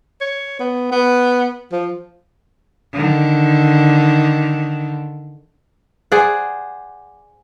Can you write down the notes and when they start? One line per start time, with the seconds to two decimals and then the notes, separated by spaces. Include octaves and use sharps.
0.21 C#5
0.60 B3
0.91 B3
1.72 F3
2.94 D3 D#3
6.12 G#4 C5 D5 F#5